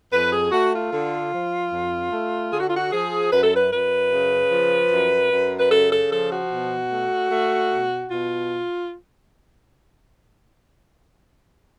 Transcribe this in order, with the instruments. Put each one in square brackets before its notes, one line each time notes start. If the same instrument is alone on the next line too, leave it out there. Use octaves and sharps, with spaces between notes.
[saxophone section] F2 B4
G#4
A3 F#4
F4
D3
F3
F2
A3
D3 G#4
F#4
F4
F#4
F3 G#4
F#2 B4
A4
B4
F#2 B4
C#3
F3
F#2
F#2
B4
C#3 A4
A4
F3 A4
F#4
B2
A3
A3
B2
B2 F4